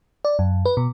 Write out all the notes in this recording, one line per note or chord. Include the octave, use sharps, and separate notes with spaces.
D5
F#2
B4
B2